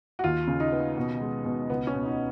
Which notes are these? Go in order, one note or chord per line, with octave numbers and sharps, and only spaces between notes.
F#4
D#2 F4
C#3
D#4
B3
B2
G#3
B2
C#2 B3
C#4
B2
D#4